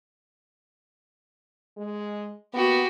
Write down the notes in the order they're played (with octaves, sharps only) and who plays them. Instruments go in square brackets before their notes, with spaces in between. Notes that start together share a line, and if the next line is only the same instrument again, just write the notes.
[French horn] G#3
[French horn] A#3 [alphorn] B3 [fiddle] F#4 G4